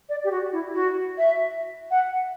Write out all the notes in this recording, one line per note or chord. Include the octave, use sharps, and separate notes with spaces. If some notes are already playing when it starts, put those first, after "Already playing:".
D5
G4
F#4
E4
F#4
E5
F#5